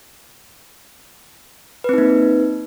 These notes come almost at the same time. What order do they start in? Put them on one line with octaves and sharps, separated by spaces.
B4 C4 D#4 A#3